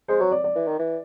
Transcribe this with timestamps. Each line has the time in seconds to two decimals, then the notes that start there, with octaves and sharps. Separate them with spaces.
0.08 G#3 C5
0.20 F#3 C#5
0.32 D5
0.44 D5
0.55 E3
0.67 D#3
0.79 E3